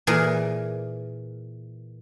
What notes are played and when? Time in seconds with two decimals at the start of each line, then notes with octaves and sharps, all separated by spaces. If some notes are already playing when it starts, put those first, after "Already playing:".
0.07 A#2 E3 G#4 A#4